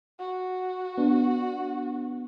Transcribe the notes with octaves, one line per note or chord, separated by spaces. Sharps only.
F#4
B3 D4